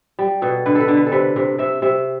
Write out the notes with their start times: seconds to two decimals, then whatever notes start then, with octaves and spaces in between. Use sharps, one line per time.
0.19 G3
0.42 B2 A4
0.66 D3 B4
0.75 A4
0.81 B4
0.88 D3
0.97 B4
1.07 A4
1.12 C3 B4
1.36 C3
1.58 C3 E5
1.82 C3 E5